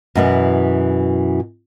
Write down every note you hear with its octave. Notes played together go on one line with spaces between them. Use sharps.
F#2 B2 E3